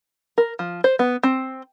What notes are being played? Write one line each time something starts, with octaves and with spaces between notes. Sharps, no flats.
A#4
F3
C5
B3
C4